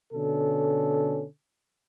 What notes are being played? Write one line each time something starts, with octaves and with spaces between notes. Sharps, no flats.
B2 D3 C#4 A4